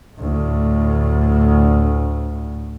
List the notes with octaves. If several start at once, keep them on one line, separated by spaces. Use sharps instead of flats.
D2 A2